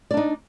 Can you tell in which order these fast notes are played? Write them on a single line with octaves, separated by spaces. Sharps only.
D5 D4 D#4